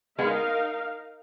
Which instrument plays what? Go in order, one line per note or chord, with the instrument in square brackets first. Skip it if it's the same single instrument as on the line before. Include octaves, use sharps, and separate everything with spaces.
[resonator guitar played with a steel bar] G#3 B3 [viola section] D#4 A#4 F5